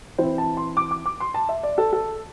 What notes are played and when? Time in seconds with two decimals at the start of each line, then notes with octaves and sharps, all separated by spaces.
0.18 E3 C4 E4 C5
0.38 A5
0.57 C6
0.77 D6
0.91 D6
1.06 D6
1.20 C6
1.34 A5
1.49 E5
1.63 D5
1.78 A4
1.93 A4